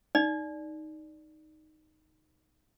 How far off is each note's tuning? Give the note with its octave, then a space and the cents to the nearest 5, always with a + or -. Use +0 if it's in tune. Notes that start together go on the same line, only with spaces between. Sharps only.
D#4 +0 D5 +0